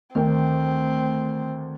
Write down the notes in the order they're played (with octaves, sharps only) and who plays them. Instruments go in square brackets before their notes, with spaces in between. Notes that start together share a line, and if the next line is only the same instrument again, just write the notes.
[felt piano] D2 A#4 G5 [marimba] D#3 [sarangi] C4